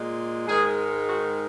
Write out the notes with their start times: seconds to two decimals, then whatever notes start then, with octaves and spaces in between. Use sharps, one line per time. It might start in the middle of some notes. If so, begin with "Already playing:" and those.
Already playing: A#2 G#3
0.46 G#2 D#3 G#3 G#4
1.08 F#4